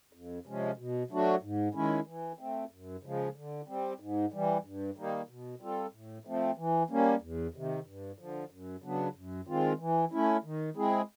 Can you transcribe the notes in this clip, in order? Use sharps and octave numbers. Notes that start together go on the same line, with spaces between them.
F2
C3 F3 G#3 C#4
B2
F#3 A3 D4 F#4
G#2
D#3 G#3 C#4 E4
E3
A3 C4
F#2
C#3 F3 G#3
D3
G3 C4
G#2
E3 G3
G2
D#3 G3 A#3 D#4
B2
G3 C4 F4 A4
A2
F3 A3 C4
E3
G3 A#3 C#4
E2
C3 D#3
G2
D3 F3
F#2
C#3 F#3 B3 D4
F#2
D#3 G#3 C4 F4
E3
A3 C#4 E4
D#3
G#3 C4 E4 G#4